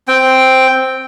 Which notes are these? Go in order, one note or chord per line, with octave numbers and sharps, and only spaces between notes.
C4 G5